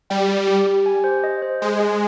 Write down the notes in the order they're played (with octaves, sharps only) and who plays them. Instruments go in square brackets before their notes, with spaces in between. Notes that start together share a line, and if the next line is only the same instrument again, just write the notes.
[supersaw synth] G3 [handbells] G5
[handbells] G4
G4
G4
G#5
C5
D#5
C5
[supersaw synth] G#3 [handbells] D#5
[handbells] G#4